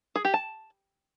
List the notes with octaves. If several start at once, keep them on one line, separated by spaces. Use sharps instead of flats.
G#4
G4
A5